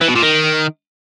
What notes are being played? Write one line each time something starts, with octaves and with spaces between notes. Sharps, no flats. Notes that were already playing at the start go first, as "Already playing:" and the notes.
E3
B2
A#2
D#3